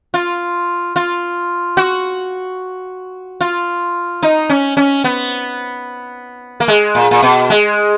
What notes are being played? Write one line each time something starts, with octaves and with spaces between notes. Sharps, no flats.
F4
F4
F#4
F4
D#4
C#4
C#4
B3
A#3
G#3
A#2
A#2
B2
G#3